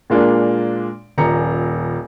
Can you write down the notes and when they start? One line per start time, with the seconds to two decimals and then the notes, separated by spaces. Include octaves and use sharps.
0.10 A#2 G#3 A#3 D4
1.18 D#1 A#1 A#5 C#7